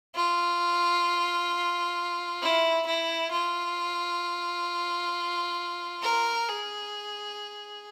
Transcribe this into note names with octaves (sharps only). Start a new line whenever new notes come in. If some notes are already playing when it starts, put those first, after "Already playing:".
F4
E4
E4
F4
A#4
G#4